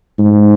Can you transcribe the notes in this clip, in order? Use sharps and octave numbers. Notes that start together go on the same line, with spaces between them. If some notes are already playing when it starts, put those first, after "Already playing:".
G#2